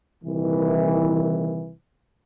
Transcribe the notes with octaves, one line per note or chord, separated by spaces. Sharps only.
C2 A#2 D#3 E3